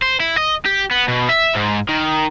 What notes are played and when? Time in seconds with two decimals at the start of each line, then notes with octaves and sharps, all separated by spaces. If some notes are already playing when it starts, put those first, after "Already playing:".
0.02 C5
0.20 E4
0.38 D#5
0.65 G4
0.91 B3
1.08 B2
1.29 E5
1.55 G#2
1.89 D#3